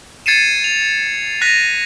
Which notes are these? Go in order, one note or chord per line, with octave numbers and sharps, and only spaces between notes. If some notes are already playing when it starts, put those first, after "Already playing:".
G#6 A6 C7 C#7 D#7 E7
F7
F#6 A#6 B6 D#7 F7